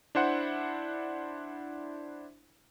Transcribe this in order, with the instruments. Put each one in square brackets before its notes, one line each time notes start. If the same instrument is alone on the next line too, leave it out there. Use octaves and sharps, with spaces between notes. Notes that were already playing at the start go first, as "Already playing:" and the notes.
[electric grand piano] D4 E4 C5 F#5